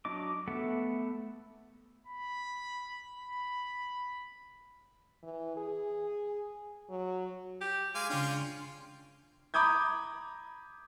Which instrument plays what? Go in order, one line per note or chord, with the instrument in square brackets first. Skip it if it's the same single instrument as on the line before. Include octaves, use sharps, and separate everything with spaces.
[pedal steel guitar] F#3 D4 D#5 D6
A3 B3 A4 E5 F#5
[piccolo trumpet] B5
B5
[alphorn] E3
G#4
F#3
[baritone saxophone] G4
[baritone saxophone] G#3 [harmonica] F5 G#5 D6
[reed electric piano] C#3 D4 [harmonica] C#4 F4 G5
[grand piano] A#5 B5 D6 D#6 G6 G#6